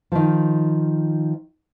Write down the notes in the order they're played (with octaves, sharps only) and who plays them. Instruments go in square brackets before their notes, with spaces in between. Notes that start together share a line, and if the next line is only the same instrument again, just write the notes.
[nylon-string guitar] D#3 F3